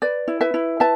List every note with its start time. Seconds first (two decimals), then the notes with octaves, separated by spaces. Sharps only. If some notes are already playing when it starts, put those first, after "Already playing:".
0.02 B4 D5
0.28 E4
0.41 B4 E5
0.54 E4
0.80 B4 E5 A5